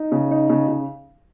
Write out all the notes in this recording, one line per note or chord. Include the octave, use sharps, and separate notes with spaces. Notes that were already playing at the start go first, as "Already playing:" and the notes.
Already playing: D#4
C#3
D#4
C#3
C#3